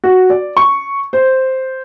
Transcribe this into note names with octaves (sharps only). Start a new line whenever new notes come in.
F#4
D5
C#6
C5